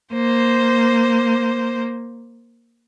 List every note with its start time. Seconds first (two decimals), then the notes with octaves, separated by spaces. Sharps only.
0.14 A#3 C5